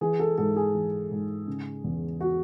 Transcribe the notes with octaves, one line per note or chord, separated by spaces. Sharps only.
E3 G#4
A4
G#2 A4
G#4
E3
G#2
C#3
E2
F#4